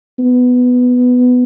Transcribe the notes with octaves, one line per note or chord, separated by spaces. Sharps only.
B3